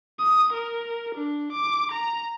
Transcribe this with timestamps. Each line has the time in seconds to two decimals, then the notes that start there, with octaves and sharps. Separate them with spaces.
0.19 D#6
0.53 A#4
1.15 D4
1.53 D6
1.92 A#5